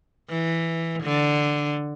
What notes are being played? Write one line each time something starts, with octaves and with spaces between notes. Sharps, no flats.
E3
D3